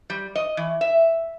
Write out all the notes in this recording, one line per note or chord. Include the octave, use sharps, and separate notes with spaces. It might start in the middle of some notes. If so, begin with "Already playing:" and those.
G3
D#5
E3
E5